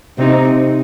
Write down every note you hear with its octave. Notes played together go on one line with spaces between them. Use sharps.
C3 C4 D#4